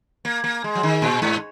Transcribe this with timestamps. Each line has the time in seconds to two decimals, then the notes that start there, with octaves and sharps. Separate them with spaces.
0.25 A#3
0.44 A#3
0.64 G#3
0.75 F#3
0.83 D#3
1.02 A#2
1.22 G#2